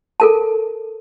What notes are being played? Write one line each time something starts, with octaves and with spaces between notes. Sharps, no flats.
A4 A#4 A5